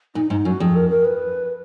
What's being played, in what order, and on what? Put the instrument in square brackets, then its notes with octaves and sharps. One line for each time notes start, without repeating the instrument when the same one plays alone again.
[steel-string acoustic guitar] A#2 [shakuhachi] D#4
[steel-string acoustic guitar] G#2 [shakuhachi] D#4
[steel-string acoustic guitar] F#2 [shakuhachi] F#4
[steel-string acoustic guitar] F2 [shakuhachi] G#4
[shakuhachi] A#4
A#4
B4